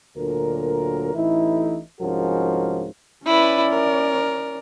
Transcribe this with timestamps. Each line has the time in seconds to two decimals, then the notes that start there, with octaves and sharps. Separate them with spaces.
0.17 D2 A#2 D3 F#3 A#4
1.14 A1 A2 E3 D#4 E4
2.00 C2 G#2 F3 C#4 F#4 A#4
3.26 C#4 E4 B4 D5
3.70 A#4